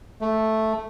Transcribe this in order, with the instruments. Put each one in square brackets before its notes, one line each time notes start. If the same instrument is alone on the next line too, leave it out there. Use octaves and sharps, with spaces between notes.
[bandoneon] A3